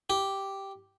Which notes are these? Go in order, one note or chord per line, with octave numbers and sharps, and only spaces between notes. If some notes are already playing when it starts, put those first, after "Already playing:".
G4